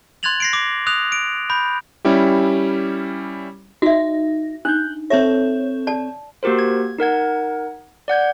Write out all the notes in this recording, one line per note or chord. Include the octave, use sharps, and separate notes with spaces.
C6 F#6 G#6 A6 F7 F#7
A#6 C7 D7
D6
D#6 F#6 F7
D7
B5 G6
G3 C#4 E4 G4
D#4 F#4 E5
D4 D#4 F#6 G6
C4 A4 C#5 E5
D5 A5
A#3 F#4 G4 A#4 C5
G#6
D#4 A#4 F#5 G#6
D5 F#5 G6 G#6